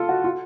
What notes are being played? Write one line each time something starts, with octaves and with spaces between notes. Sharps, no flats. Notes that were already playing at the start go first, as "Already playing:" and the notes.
Already playing: F4 A4
F#4
F4